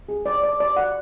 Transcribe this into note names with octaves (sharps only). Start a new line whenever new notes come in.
G#4
D5
D5
D5
F#5